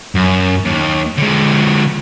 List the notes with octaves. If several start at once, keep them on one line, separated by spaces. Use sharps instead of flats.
F#2
D#2
D3 G#3